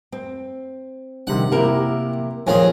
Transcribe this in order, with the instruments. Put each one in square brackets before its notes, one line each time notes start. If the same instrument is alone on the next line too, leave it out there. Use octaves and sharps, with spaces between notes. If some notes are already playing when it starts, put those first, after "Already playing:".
[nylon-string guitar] C4
[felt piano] G2 C3 D#3 [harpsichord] F#5
[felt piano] C3 E4 G4 [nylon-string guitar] A#3 A#4
[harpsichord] F2 C#4 G#4 [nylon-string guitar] D#3 C4 F4 [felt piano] G#5